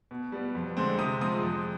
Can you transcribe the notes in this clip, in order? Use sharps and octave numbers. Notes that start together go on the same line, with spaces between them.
B2
G3 B3
F2
D3 G#3 C4
C3 D#6
F3 G#3 C4 D#6
F2